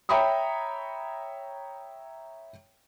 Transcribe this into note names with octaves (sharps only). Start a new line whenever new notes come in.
C#5 E5 G5 A#5 B5 D#6